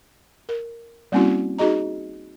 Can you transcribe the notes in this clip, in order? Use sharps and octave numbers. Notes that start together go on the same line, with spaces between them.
A#4
G3 A#3 C4 C#4 E4 F#4
D#4 F#4 G#4 D#5 A#5